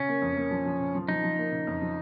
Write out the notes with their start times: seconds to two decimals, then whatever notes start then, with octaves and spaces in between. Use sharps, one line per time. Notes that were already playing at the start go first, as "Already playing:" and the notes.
Already playing: C#3 C#4
0.09 A#3
0.22 F2
0.37 A#3
0.51 F3
0.66 F3
0.80 C#3
0.95 F3
1.08 F3 D#4
1.23 F3
1.38 A#3
1.52 C#3
1.67 F2
1.82 F3